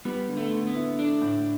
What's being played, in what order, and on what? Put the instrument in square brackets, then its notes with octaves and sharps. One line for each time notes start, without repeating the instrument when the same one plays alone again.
[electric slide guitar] G3 [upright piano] B3
[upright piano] D3
[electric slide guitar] A3
[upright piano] D3
[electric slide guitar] B3
[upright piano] E4
[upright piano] A3 [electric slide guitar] D4
[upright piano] A2